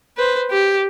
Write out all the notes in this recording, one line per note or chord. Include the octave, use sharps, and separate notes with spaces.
B4 C5
G4